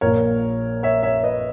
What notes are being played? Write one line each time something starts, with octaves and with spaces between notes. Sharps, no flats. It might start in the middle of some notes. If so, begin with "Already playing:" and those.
A#1 A#2 A#4 C#5
C#5 E5
C#5 E5
B4 D#5